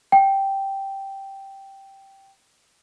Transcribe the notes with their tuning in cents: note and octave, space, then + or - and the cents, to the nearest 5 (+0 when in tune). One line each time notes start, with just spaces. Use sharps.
G5 -5